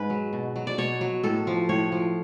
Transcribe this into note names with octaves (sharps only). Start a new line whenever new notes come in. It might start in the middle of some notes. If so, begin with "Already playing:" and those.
Already playing: G#2 B4
F#3
B2
F#3
D5
B2 C#5
F#3
A2 A4
F3
A2 C#5
F3